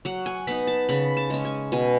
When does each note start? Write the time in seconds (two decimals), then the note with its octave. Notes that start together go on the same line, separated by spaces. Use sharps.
0.05 F#3 F#5
0.26 G#5
0.47 B3 D#4 B5
0.67 A5
0.89 C#3 B5
1.17 A5
1.30 G#3 C#4
1.45 G#5
1.72 B2 G#5